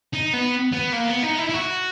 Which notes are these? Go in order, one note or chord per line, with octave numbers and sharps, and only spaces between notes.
D#4
B3
B3
A#3
B3
D#4
E4
E4
F#4